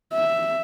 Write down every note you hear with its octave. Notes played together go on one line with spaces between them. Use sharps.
E5